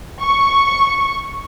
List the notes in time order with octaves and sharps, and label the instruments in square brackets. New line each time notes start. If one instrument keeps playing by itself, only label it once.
[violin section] C#6